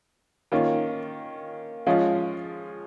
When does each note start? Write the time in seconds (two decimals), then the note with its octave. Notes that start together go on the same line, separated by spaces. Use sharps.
0.52 D#3 A#3 C#4 F4
1.87 F3 G#3 C#4 F4